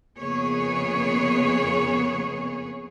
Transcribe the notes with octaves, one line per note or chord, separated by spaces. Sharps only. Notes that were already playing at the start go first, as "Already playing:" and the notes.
F2 C#3 A#3 B3 G#4 C#5